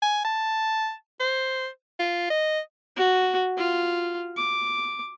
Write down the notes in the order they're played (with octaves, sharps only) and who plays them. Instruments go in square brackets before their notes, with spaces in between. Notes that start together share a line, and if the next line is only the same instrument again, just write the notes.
[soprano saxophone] G#5
A5
C5
F4
D#5
[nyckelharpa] F#4
F4
D6